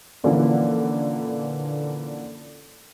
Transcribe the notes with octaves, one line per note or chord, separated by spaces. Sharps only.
A#2 D3 E3 F3 A#3 C#4